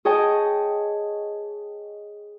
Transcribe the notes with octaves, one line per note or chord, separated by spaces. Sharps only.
G#4 C#5 D#5 G5 A5